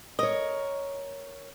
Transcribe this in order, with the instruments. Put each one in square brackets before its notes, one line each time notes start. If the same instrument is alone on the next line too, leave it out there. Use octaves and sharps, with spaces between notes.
[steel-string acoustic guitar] A#4 C#5 [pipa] D#5